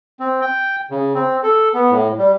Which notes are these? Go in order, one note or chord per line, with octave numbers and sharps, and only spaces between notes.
C4
G5
C#3
C4
A4
B3
A2
G3